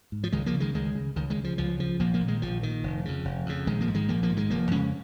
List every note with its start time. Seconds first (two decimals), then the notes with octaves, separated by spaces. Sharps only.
0.12 G#2
0.24 F3
0.32 C#2 D#3 G#3
0.46 F3 A#3
0.54 C#3
0.60 D#3 G#3
0.74 C#2 D#3 G#3
0.95 C#3
1.16 C#2 D#3
1.30 D#3 G#3
1.37 C#3
1.44 F3
1.58 C#2 F3
1.79 C#3 F3
1.99 A#1 F3 A#3
2.14 F3 A#3
2.21 A#2
2.28 D#3 G#3
2.42 A#1 F3
2.62 A#2 D#3
2.83 F1
3.05 F2 C#3
3.25 F1
3.46 F2 C#3
3.67 A#1 D#3 G#3
3.81 F3 A#3
3.88 G#2
3.95 D#3 G#3
4.08 A#1 F3 A#3
4.23 F3 A#3
4.29 G#2
4.37 D#3 G#3
4.50 F1 F3 A#3
4.71 F2 C#3 G#3 C#4